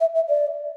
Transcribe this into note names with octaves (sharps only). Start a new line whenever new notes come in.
E5
E5
D5